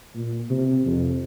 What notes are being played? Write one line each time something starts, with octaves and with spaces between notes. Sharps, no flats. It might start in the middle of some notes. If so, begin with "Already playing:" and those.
A#2
C3
F2